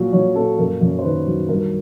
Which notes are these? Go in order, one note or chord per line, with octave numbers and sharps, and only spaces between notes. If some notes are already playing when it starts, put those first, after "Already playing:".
Already playing: A#2 F#3
F#3 C#5
A#2 A4
F#2 A#4
F#2
C5
D#3 B4
F#3
G2 A#4